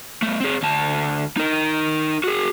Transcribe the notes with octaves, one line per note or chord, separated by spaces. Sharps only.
A3 B3
C4 G#4
D2 A5
D#4 A#4
F#4 G#4